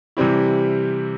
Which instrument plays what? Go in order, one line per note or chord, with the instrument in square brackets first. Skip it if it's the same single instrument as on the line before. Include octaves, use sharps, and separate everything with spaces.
[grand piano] C3 E3 G3 C4 E4